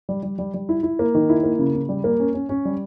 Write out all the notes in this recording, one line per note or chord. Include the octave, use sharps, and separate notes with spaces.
G3
G3
G3
G3
E4
E4
A#3
D#3
E4
A#3
C#3
C#3
G3
A#3
C#4
C#4
C#4
G3